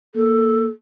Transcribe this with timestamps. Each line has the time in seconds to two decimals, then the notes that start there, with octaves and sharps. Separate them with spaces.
0.15 A#3 A4